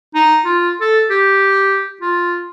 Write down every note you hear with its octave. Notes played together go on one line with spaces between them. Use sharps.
D#4
F4
A4
G4
F4